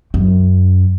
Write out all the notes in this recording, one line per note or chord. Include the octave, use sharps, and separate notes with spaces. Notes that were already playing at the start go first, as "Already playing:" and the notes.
F#2